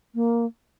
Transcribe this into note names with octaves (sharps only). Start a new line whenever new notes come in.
A#3